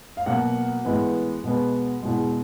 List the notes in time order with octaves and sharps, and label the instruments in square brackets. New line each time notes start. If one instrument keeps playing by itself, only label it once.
[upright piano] F5
B2 F#3 A#3 F#5
A2 E3 G#3 B3
B2 G#3 B3
E2 B2 G#3